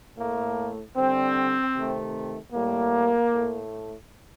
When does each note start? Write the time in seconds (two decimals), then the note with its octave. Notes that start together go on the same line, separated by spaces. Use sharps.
0.16 A2 A3 A#3
0.95 D3 G3 C4
1.74 C3 D#3 A3
2.52 A2 G3 A#3
3.31 A2 A3